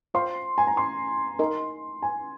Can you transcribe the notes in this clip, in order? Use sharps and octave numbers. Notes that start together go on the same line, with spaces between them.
F4 C5 F5 C6
G#5
A#5
C6
D#4 A#4 D#5
G#5